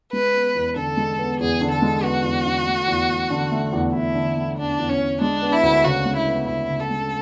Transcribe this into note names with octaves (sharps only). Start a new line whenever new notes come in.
G#3 B4
B3
E2
D3 A4
G#3
B3
E2 G#4
D3
A4
G#3
B3 F#4
E2
D3
A3
E2
E2
D3
A3
E2
E2 E4
D3
A3
E2 D4
E2
C#4
D3
G#3 D4
B3
E4
D2
C#3 F#4
G#3
E4
B3
D2 E4
C#3
A4
G#3